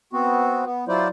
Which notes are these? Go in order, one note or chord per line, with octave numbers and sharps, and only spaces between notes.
B3 C4 F#4
B3
F#3 E4 F4 C5 D5